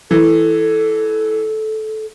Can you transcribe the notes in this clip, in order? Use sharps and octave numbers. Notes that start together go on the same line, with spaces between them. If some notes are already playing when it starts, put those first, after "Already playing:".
E3 A4